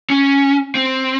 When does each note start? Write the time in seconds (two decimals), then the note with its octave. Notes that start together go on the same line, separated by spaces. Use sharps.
0.10 C#4
0.75 C4